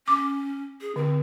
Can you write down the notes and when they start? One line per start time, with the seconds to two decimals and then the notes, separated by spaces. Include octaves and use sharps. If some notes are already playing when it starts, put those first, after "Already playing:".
0.08 C#4 D6
0.81 G#4
0.96 D3 C4